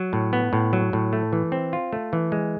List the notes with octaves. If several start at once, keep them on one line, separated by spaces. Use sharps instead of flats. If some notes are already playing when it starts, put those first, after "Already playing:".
Already playing: F#3
A2
B3
A2
F#3
A2
A3
E3
C4
F4
A3
E3
G#3